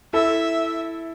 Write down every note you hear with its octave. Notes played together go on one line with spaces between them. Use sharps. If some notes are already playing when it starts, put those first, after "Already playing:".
E4 A4 E5